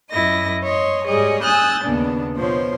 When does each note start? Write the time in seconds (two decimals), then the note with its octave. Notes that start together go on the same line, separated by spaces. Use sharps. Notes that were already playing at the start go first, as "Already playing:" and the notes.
0.10 F#2 E4 D#5 A#6
0.63 C#5 D#5 C6
1.05 G#2 G3 G#4 C#5 D#5
1.42 G#5 D#6 E6 F#6 G6 A6
1.84 D#2 C#3 B3 D4
2.36 B2 F3 C5 C#5